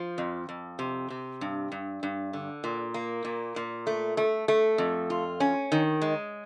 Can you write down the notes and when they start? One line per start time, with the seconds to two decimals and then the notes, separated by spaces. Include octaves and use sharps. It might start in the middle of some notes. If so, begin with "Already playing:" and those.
Already playing: F3
0.18 F2
0.49 F2
0.79 C3
1.10 C3
1.41 G2
1.72 G2
2.03 G2
2.33 D3
2.64 A#2
2.94 A#3
3.25 A#2
3.56 A#2
3.87 A3
4.17 A3
4.48 A3
4.78 F2
5.10 F4
5.40 C#4
5.72 D#3
6.02 G#3